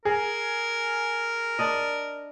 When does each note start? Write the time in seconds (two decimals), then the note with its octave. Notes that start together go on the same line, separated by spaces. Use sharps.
0.05 G#4 A#4
1.59 D4 D5 D#5